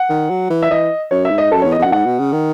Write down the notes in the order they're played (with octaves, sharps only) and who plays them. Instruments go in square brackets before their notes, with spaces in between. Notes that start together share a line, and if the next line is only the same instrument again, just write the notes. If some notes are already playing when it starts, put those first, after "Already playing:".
Already playing: [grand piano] F#5
[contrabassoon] D#3
F#3
E3
[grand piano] E5
[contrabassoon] E3 [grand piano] D#5
[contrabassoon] F#2 [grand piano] C#5
[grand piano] E5
[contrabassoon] G#2
[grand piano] D#5
[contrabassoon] F#2 [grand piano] A4
[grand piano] C#5
[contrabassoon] E2
[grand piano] D#5
[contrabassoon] E2 [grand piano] F#5
[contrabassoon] F#2
[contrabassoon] G#2 [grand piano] F#5
[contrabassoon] B2
C#3
D#3